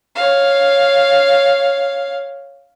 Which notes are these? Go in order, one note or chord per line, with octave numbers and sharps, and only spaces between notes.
C#5 F5